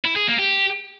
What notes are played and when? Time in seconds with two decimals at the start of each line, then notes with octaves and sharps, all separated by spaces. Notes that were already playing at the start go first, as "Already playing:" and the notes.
0.04 E4
0.16 G#4
0.27 A#3
0.39 G4